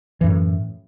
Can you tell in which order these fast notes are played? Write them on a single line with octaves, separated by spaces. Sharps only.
E3 F#2 A2